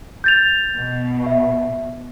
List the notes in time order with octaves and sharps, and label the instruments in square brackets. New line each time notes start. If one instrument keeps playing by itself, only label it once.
[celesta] G6 A6 F7
[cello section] B2
[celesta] E5